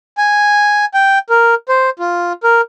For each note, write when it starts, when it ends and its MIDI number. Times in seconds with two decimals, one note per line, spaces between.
0.18 0.85 80
0.94 1.19 79
1.30 1.55 70
1.69 1.90 72
1.99 2.33 65
2.43 2.61 70